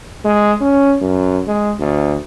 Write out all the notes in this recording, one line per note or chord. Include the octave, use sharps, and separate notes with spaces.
G#3
C#4
F#2
G#3
D2